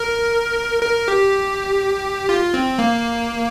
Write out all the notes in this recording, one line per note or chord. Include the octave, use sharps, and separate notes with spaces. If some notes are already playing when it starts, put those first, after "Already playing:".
Already playing: A#4
A#4
G4
F4
C4
A#3